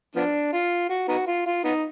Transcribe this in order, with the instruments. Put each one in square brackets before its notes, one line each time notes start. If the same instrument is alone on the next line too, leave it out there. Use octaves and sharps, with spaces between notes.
[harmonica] F3 B3 D4
F4
F#4
B3 D#4 F#4
F4
F4
B3 D#4